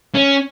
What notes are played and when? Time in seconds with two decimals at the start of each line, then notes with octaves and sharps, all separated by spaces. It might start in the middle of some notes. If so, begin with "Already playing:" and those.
0.15 C#4